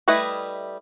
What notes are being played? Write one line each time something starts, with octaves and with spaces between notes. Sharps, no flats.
G3 A3 E4 B4 D#5